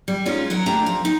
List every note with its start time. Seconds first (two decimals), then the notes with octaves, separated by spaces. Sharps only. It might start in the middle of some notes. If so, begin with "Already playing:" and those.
0.08 G3
0.26 G#3 C#4 D#4 F4
0.50 F#3 D#4 A#4
0.66 D#2 A3 D4 G4 A#5
0.86 F3
1.05 D#4